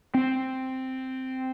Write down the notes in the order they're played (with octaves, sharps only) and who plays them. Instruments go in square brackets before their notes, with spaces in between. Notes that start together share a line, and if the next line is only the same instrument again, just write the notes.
[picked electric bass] C4